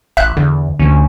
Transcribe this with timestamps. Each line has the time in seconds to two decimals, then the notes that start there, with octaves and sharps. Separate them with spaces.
0.17 A1 E5 F#6
0.37 E2 D3
0.79 D2 C#4